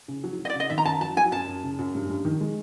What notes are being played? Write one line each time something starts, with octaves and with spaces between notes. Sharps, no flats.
C#3
F#3
F#3
D#5
D5
C#3 D#5
D#3 E5
A#5
F#2 A5
F#3 A5
F#3 G#5
F#2 A5
F#2
C#3
F#2
G2
G2
D#3
G#3